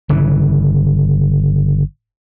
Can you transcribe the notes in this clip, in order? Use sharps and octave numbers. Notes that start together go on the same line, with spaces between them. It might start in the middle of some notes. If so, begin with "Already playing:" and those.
G1 C#3 E3